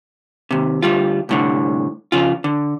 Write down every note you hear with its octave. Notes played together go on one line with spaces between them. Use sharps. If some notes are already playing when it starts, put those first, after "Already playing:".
D#2 C3
D2 G3 F4
C2 A2 D3
F2 C#3 F4
D3